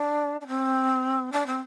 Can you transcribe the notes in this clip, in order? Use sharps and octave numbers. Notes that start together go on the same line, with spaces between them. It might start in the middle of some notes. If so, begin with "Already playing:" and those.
Already playing: D4
D4
C4
D4
C4